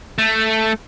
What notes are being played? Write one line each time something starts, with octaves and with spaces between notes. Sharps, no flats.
A3